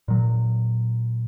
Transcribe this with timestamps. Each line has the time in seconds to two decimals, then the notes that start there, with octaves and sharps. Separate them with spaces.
0.08 A#2 F#3